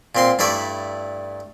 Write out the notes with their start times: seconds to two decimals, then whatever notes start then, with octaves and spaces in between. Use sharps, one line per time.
0.15 A#2 C4 C6
0.39 G2 A3 E4 D5 B5